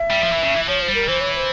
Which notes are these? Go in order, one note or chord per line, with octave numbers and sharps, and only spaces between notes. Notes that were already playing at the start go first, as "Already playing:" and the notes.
Already playing: E5
G3
F3
E3
C#3
E3
F3 C#5
C5
G3
A#4
E3 C5
C#5
C#5
C5